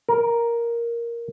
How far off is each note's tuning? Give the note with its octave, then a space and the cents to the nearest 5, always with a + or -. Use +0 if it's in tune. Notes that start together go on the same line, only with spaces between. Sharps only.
A#4 +5